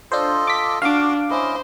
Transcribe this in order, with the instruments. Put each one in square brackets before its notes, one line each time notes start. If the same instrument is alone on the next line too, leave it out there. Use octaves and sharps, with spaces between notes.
[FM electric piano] D4 C5 [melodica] F4 A4 D#5
[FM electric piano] D6 B6
[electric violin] D4 [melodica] F#4 [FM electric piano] F5 D6
[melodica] C#4 E4 D#5 [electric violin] C5